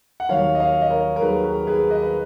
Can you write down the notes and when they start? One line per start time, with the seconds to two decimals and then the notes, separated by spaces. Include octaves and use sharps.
0.20 F#5
0.29 D#2 D#3 F#3 C#5 F5
0.55 D#5
0.60 C#5 F5
0.82 D#5
0.90 A#4 C#5
1.16 A#4
1.21 D#2 D#3 F#3 G#4 B4
1.44 G#4 B4
1.67 G#4 B4
1.89 B4 D#5
2.02 B4